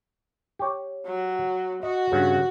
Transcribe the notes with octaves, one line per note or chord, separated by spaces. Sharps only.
G4 C#5
F#3
F#4 D#5
G2 C#3